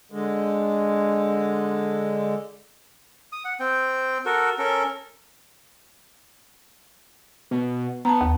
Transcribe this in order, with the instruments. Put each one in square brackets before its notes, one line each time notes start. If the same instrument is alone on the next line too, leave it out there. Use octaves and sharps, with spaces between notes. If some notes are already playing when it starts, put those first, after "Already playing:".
[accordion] D3 G#3
[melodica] D#6
F#5
C4 G5
F#4 A4 A#4
C#4 A4 A#4
[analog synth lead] B2
[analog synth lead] B3 [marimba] A5 A#5
[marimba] D#2